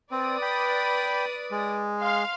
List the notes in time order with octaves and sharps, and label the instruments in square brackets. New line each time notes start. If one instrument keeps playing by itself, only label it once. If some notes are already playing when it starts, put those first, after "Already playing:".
[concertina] C4 [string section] B4 D5 D#6
[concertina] G5 B5
G#3
[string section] F5 C6